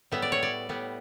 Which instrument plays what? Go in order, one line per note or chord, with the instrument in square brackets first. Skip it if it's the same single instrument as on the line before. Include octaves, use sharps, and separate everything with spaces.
[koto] A2 G3 B3 E5
D5
C#5
D5
A2 G3 B3